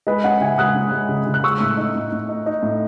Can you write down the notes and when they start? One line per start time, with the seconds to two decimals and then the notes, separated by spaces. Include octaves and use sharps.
0.07 G#3 B4 D#5
0.23 C#4 D#5 F#5
0.41 C#3 E5 G#5
0.58 G#3 D#6 F#6
0.75 C#4
0.92 G#3
1.09 C#3
1.26 C#3
1.34 F#6
1.43 G#3 C#6 E6
1.60 A2
1.77 D#4
1.95 A2
2.12 A2
2.29 D#4
2.46 D#4
2.62 A2